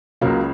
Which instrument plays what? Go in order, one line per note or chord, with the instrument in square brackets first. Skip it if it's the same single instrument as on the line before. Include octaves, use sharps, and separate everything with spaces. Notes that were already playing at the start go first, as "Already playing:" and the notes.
[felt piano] C#2 C#3 F#3 A#3